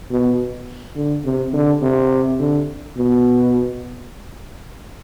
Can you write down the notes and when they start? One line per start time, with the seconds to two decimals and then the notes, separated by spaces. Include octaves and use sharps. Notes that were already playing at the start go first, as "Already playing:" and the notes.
0.11 B2
0.96 D3
1.25 C3
1.53 D3
1.82 C3
2.39 D3
2.97 B2